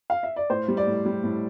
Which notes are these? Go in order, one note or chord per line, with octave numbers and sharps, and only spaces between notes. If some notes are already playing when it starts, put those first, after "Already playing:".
F5
E5
D5
A2 C5
G3
D5
A2
G3
A2